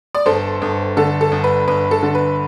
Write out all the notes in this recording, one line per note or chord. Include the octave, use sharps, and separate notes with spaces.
D5
G1 A4 C5
G1
D3 A4
A4
G1
B4
G1 B4
A4
D3
B4